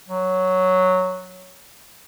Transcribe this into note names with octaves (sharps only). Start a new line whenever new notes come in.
F#3